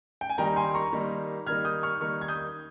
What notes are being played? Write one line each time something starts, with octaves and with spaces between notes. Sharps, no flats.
G5
G#5
D#3 G3 A#3 D#4 G5 A#5
G#5 C6
A#5 C#6
D#3 G3 A#3 D#4
D#3 G3 A#3 D#4 F6 G#6
D#6 G6
C#6 F6
D#3 G3 A#3 D#4 C#6 F6
G#6
D#6 G6